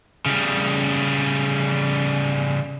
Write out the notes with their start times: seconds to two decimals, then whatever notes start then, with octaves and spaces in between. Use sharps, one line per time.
0.26 C#3 G3